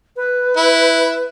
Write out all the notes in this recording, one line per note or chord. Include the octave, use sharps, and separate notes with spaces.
B4
E4